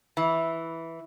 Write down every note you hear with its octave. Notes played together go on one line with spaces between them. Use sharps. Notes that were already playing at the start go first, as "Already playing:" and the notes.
E3